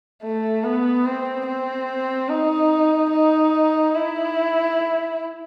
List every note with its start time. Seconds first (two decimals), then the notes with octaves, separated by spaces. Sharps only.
0.23 A3
0.64 B3
1.06 C4
1.47 C4
2.29 D#4
3.12 D#4
3.95 E4